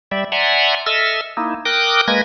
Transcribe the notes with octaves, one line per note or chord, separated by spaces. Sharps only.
G3 D5 E5
D5 E5 F#5 G#5 A#5 C6
A4 D#5 E5 E6 F6
A#3 D#4 E4
A#4 G5 D6 D#6 F#6
G#3 A#3 B4 G#6 A#6